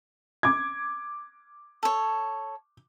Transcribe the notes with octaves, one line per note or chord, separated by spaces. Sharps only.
D6 G#6
A4 C#5